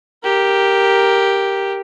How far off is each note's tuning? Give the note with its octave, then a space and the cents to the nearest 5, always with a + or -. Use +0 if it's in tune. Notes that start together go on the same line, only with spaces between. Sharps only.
G4 +0 A#4 +0